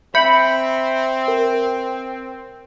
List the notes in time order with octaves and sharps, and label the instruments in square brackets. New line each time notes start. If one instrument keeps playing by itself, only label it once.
[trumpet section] C4 [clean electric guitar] E5 [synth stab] B5 [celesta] G6 C#7
[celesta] A#4